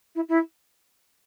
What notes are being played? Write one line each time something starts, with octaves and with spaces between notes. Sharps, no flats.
E4
E4